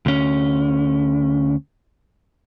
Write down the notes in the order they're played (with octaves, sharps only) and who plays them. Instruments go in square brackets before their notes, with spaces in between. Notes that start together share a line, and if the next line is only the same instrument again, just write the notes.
[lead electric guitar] D2 C#4